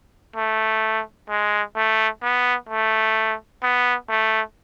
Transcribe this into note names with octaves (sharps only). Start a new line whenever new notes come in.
A3
G#3
A3
B3
A3
B3
A3